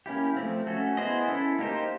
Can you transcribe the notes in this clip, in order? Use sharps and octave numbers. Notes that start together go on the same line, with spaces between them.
A#3 C#4 E4 G4
F3 A3 C4
A3 C#4 F#4 A4
B3 E4 G#4 C5 D#5
C#4 E4 A4
A#3 D#4 G4 C5